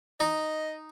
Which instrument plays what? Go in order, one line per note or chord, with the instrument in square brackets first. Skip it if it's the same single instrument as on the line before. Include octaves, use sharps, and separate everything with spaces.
[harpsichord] D#4 [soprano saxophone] D#5